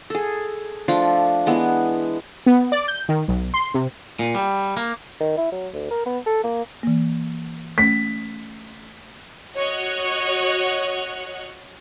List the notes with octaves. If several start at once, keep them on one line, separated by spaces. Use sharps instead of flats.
G#4 A4
F3 A3 D4 F4
E3 G#3 B3
B3
D5
G6
D#3
B1
C6
C3
A#2
G3
A#3
D#3
E4
F#3
D2
A#4
B3
A4
A#3
E3 A#3
A3 C#4 B6
F#4 C#5 D#5 F#5 F#6